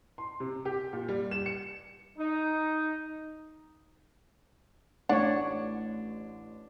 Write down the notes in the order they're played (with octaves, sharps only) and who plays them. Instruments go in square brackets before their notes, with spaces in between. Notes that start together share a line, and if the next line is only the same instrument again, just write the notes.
[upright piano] C6
C3
G4
A#2
G3
E7
C#7
[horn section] D#4
[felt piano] A1 [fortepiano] D4 [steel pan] C#5 D5 [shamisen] F#5